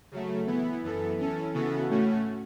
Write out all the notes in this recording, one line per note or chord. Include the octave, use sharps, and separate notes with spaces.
C#3 F#3 A3
E3 B3 E4
F#2 E3 B3 A4
E3 C#4 A4
C#3 E3 B3 F#4 A4
A2 A3 C#4 F#4